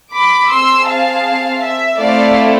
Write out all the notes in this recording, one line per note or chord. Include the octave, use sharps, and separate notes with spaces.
B5 D6
C4 G#4 C6 E6
F5 A5
E5
A3 C4 E4 A4 D5 F5